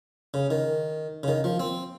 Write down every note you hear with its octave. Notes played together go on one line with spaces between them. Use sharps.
C#3
D#3
C#3
D#3
F3
C4